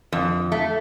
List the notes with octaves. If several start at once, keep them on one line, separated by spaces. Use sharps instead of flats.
F2
A3